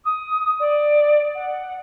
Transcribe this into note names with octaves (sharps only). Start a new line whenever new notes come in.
D#6
D5
F#5